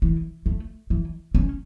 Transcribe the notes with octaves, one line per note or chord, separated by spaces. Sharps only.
E3
A3
E3
C#4